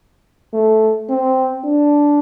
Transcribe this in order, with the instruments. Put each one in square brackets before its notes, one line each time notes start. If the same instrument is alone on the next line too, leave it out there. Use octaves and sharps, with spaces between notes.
[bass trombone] A3
C4
D4